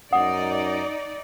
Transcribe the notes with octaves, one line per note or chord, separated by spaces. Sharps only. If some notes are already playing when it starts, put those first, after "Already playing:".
F#2 D#4 D5 F#5 D#6